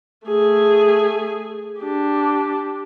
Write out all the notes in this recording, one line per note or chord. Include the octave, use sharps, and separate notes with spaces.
A3 G#4
D4 G4